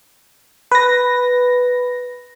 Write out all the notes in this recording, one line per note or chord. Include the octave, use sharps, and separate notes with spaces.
B4 A#6